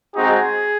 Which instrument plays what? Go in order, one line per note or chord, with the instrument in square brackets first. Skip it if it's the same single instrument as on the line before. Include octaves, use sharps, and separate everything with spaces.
[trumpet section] G#3 C4 D#4 F#4 G#4